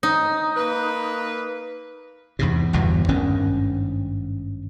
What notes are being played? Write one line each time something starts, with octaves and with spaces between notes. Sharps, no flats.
D#4
A#3 B4
E2 G#2 C3
G1 E2 B2
G#1 G2 D#3 C#4